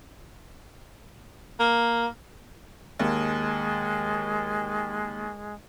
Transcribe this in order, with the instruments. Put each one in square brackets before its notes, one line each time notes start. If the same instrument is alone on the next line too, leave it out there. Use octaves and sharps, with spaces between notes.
[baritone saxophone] A#3
[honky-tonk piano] D#2 [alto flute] G#3